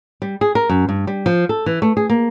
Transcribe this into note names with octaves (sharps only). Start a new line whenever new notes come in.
G3
G#4
A#4
F#2
G2
G3
F3
A4
E3
A3
G#4
A#3